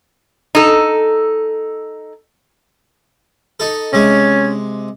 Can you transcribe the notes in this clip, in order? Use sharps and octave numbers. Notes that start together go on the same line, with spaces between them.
D#4 A4
D#4 A4
C3 G#3 C#4